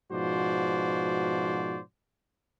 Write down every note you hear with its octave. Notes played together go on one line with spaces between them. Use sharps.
G#2 B2 F3 F#4 C5 D5